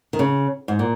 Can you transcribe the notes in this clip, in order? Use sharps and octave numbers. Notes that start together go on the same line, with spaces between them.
D#3
C#3
G#2
A#2